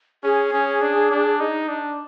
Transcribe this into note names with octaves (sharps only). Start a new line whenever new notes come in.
C#4 G#4
C#4
D4
D4
D#4
D4